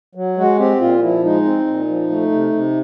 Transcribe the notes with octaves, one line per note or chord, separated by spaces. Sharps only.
F#3
G#3 F#4
C4 G4
A#2 F4
F3 E4
G#3 D#4
C4
A#2
F3
A3
C3
C3